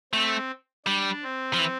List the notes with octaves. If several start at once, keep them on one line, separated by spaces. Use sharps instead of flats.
A3 C4
G3 D4
C4
F3
E3